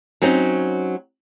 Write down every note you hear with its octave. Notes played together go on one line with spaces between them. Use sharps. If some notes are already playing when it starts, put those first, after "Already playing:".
F#3 C4 C#4 D#4